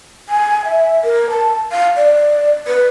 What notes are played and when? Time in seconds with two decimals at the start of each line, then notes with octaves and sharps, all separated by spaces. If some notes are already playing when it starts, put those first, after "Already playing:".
0.29 G#5
0.65 E5
1.04 A#4
1.30 A5
1.72 F5
1.96 D5
2.67 B4